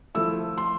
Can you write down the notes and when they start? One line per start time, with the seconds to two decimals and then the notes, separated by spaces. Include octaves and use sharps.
0.15 F3 A3 E4 E6
0.58 C6